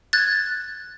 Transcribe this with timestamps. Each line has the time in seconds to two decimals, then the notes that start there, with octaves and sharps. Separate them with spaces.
0.13 F#6 G#6 A6